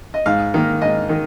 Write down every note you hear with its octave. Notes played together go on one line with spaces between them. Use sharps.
D#5
G#2 F5
D#3 A#3
G#2 D#5
D#3